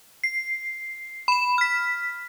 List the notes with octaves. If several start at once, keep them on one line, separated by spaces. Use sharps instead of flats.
C7
B5 E7
F6 B6